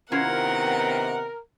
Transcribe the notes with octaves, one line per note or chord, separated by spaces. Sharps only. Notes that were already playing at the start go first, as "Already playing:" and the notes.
C3 D#3 B3 C#4 E4 F4 A#4 F#5